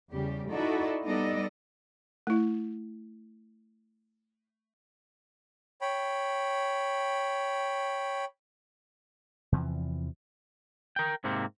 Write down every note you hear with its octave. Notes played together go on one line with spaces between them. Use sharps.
E2 C#3 G3 G4
D#4 E4 F#4 A4 D5 D#5
G3 B3 D#4 A4 D5 D#5
A3 E4
C#5 G5 B5
E2 C3 E3 F3
A#4 G5
G#2 C3 A#3 C4